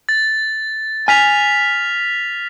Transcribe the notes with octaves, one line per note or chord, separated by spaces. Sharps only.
A6
G#5 F6 B6 F7